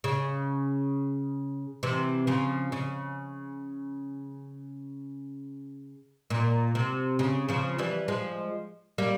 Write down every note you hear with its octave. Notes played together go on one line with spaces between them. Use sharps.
C#3
C3 E3
C#3 F3
C#3
A#2
C3
C#3
C#3 F3
E3 G3
F3 G#3
G3 A#3